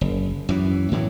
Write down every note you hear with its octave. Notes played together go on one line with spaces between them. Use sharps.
F#1
F#2 E3
A2 E3 F#3